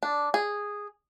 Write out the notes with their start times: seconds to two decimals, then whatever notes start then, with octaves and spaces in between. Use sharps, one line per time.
0.03 D4
0.34 G#4